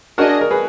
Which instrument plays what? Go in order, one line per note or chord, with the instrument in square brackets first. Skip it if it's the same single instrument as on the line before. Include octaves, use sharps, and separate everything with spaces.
[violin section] D4 G#4 D#5 [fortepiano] F#4 A#4
[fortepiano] A#4
G#4 B4